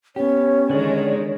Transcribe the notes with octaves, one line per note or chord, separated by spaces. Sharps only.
B3 C#4 G4 C#5
D3 D#3 G#3 D5